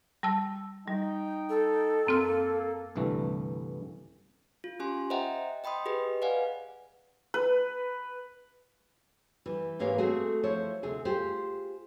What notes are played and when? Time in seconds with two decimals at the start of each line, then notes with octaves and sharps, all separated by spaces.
0.23 G3 A5 E6
0.87 G3 D#4 G5
1.50 A4
2.07 F#2 A#3 C4 F6
2.96 C2 G2 D3 E3 A3
4.64 F4
4.80 C#4 G4 G#5 C6
5.10 C5 D#5 E5 F#5 G5 A#5
5.64 D#5 G5 B5 C6 D#6
5.85 G4 G#4 B4 D#5
6.22 B4 D5 F5 F#5 G#5
7.34 B4
9.46 E3 G3
9.79 G#2 E3 A#3 G4 C#5 F5
9.98 A3 C4 F#4 G#4
10.43 F3 E4 C5 C#5
10.83 D2 C3 G#4
11.05 F4 G4 G#4 C5